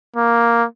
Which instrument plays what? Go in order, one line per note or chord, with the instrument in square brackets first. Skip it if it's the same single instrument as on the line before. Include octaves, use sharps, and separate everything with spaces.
[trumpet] A#3